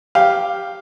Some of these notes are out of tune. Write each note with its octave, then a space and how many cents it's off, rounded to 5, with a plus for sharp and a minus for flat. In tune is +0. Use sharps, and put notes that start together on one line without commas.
G4 +0 F5 +0